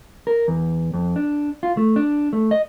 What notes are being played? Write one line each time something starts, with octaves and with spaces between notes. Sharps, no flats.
A#4
E2
F2
D4
F4
A3
D4
A3
D#5